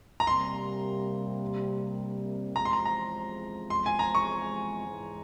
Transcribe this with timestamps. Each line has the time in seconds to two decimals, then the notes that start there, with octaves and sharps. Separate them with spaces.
0.20 A#5
0.27 C3 G3 A#3 C6
2.56 E2 C3 F3 G#3 A#5
2.65 C6
2.73 A#5
2.86 A#5
3.70 C6
3.86 G#5
3.99 A#5
4.15 C#6
4.86 G#2 E3 G#3